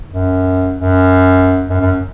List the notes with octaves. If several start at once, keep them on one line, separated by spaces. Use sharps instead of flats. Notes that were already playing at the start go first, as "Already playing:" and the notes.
F#2
F#2
F#2
F#2